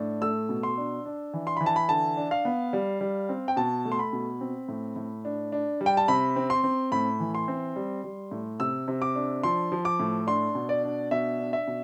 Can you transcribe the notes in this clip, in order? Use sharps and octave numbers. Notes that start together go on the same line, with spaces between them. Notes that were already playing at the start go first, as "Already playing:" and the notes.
Already playing: A2 D4
A3 E6
B2
C6
D4
D4
E3
C6
E3 B5
A5
B5
D3 A5
D4
F5
B3
G3
G3
C4
G5
B2 A5
A3
C6
B5
B2
C4
A2
A2
D4
D4
G3
G5
A5
C3 B5
C4
C6
C4
A2 B5
E3
C6
C4
G3
G3
A2
C3 E6
C3
D6
D4
F3 C6
F3
D6
A2
D4 C6
B2
D5
D4
B2 E5
D4
E5
B2